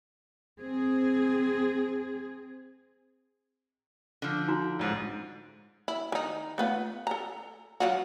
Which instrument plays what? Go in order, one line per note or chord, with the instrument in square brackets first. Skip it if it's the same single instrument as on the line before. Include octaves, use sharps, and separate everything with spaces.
[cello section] C4 G#4
[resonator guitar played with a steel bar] D3 F3
[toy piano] D#4 F#4 A#5
[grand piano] A1 G#2
[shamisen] E4
D#3 D#4
A3 B3 F4
A4 A#5
F#3 F4 F#4